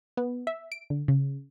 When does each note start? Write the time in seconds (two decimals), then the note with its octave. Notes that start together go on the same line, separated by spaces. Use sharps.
0.17 B3
0.47 E5
0.72 D7
0.90 D3
1.08 C#3